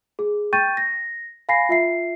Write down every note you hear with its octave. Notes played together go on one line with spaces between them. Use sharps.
G#4
G5 C#6 G6 A6 D#7
A#6
F5 G#5 B5 A#6 C7
F4 E5 C7